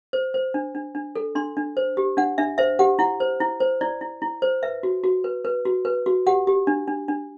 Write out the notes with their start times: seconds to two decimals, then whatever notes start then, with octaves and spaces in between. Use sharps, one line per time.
0.13 C5
0.34 C5
0.54 D4
0.75 D4
0.95 D4
1.15 A4
1.35 D4 C6
1.57 D4
1.77 C5
1.97 G4
2.17 D4 F#5
2.38 D4 E5
2.58 C5 E5
2.79 G4 F#5
2.99 E4 F#5
3.20 C5
3.40 E4
3.60 C5
3.81 E4 D5
4.01 E4
4.22 E4
4.42 C5
4.62 B4 E5
4.83 F#4
5.04 F#4
5.24 B4
5.45 B4
5.65 F#4
5.85 B4
6.06 F#4
6.26 G4 F#5
6.47 G4
6.67 D4
6.88 D4
7.08 D4